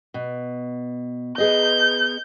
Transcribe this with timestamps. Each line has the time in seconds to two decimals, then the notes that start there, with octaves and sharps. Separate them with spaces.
0.14 B2
1.38 B3 G#4 D#5 G6